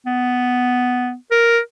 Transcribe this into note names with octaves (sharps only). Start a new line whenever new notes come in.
B3
A#4